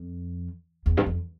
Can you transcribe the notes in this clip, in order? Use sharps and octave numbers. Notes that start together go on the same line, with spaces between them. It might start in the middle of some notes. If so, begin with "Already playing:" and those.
Already playing: F2
E2
G2
F2